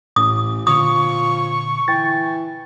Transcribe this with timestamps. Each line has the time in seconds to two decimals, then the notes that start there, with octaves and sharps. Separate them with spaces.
0.16 A1 A2 D#6
0.67 A#2 D3 F3 C#6 D#6
1.88 E3 G5 A6